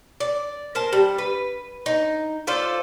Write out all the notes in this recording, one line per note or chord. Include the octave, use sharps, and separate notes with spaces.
D5
A#4 C5 A5
G3
B4
D#4
F4 A4 C5 D5